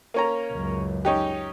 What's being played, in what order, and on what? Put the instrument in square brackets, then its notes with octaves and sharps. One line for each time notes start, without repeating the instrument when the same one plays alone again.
[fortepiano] A#3 C#4 A#5
[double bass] C#2 F#2
[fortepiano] C#4 D#4 G4